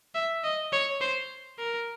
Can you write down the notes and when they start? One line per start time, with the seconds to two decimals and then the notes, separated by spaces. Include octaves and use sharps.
0.15 E5
0.44 D#5
0.73 C#5
1.01 C5
1.59 A#4